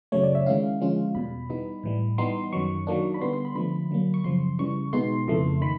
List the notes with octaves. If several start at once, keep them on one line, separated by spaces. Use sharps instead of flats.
F#2 C#3 F#3 A3 C#5
D5
E5
D#3 G#3 C#4 E4 F5
D3 F3 G#3 C#4 F4
E2 B2 G3 B5
E3 G3 B3 D#4
A2 E3 G3
E3 G3 B3 D#4 C6
F#2 D#3 F#3 C#6
D#3 F#3 A#3 D4
B5
D3 G3 B3 C6
C6
B5
D3 F3 A3 B5
D3 F#3 A#3
C#6
F#2 C#3 F3 C6
C#3 E3 G3 C#6
B2 G#3 B3 D#4 C6
F2 C#3 E3 A3
D#3 B5